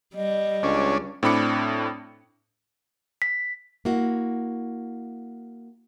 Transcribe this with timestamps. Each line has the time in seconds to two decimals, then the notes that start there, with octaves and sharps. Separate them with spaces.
0.15 G3 D#5
0.63 C#2 C#4 D4
1.23 A2 C4 D4 B5 D6 C#7
3.22 B6
3.85 A#3 E4 F#4